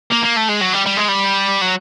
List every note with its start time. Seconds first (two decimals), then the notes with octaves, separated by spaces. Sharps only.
0.11 A#3
0.24 A#3
0.36 A3
0.48 G#3
0.61 F#3
0.73 G3
0.86 G3
0.97 G#3
1.08 G3
1.61 F#3